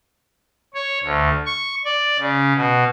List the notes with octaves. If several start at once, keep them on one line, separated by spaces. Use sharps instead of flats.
C#5
D2
C#6
D5
C#3
B2